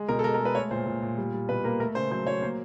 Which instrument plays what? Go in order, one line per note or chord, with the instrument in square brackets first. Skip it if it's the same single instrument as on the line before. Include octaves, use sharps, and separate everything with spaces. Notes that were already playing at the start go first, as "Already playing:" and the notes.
Already playing: [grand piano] G#3
B2 A#4
A4
G#3 A#4
A#4
G#3
B4
A3 C#5
A#2 C5
A#2
A#2
G3
G3
B2 B4
A#3 A#4
A3 A#4
C#3 C5
F#3 C5
F#3 C#5
A#3 C5